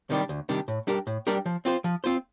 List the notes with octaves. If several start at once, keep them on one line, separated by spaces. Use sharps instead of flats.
C3 D#3 G3 D4
D2
C3 D#3 G3 D4
A2
G3 D4 G4 A#4
A2
G3 D4 G4 A#4
F3
C4 F4 C5
F3
C4 F4 C5